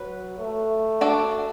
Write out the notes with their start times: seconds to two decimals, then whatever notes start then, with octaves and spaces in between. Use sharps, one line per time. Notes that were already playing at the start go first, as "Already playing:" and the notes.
Already playing: F#3 B4
0.38 A3
1.01 D4 F#4 A4 D5